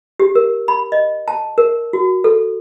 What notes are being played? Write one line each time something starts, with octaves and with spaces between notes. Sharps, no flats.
G4
A#4
B5
D#5
A5
A#4
F#4
A4